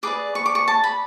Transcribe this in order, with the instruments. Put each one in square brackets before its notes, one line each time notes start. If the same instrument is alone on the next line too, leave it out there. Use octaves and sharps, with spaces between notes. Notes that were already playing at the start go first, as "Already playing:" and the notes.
[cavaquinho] G#4 B4 D5 D6
C#6
D6
C#6
A5
B5